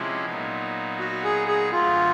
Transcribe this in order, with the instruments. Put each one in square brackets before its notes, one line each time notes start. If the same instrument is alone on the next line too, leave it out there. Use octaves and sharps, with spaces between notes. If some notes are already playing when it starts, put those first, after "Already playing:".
Already playing: [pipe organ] C3 F3 G#3 C#4 E4
A#2 F#3 B3 D#4
[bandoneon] F#4
G#4
G#4
[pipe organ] F#2 D3 F#3 A3 [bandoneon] F4